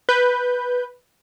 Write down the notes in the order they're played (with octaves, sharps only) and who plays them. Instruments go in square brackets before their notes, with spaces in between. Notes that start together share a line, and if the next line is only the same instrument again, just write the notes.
[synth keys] B4 G6